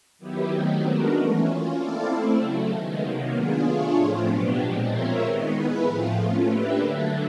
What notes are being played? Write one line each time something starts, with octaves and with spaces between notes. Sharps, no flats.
D#3 F#3 B3 E4 G4
D#3 F#3 A3 C4 D#4
G#3 B3 D4 F#4 A#4
E3 A3 C#4
A#3 C#4 F4
C4 E4 A4 D5 F5
A3 C4 E4
C#3 F#3 A3
D#3 G#3 B3
C3 D#3 F#3 A#3
B3 D4 F4 G#4
A3 D4 F4 G#4 C#5
A2 F3 A3 C4 F4
B2 F#3 B3 D4 G4
A#2 F3 G#3 C4
C4 F4 A#4 C#5 E5
D#3 G#3 B3 D#4
B3 E4 G#4 B4
A2 F3 A3 C4 F4
A3 C#4 F4
A#3 D4 G4 B4 E5
D3 F#3 A3